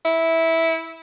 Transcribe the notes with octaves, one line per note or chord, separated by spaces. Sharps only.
E4